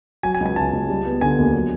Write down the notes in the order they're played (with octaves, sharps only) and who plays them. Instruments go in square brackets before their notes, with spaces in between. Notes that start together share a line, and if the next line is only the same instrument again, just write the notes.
[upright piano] F#3 [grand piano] G#5
[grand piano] G#5
[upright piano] C#2
[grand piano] G#5
[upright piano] C#3 [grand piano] A5
[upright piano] C#2
G3
B3
[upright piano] D3 [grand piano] G#5
[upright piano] D#2
F#3